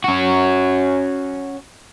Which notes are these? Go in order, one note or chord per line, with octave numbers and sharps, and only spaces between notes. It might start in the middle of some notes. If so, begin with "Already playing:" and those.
C#4 F#4